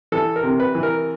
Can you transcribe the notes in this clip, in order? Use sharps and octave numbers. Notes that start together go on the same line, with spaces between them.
E3 A4
A#4
C3
B4
E3
A#4